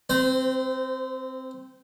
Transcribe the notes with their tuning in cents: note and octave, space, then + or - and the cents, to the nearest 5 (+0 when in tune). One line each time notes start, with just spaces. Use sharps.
C4 +0 C5 -30